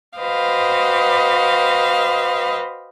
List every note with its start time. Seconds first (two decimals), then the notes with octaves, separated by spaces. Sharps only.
0.19 F#4 B4 C5 D#5 F5 G5